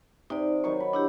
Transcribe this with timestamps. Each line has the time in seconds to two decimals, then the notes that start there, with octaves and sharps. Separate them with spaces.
0.30 C3 D#4 D5
0.64 D#3 F#3 C#6
0.80 B5
0.93 D4 E4 G4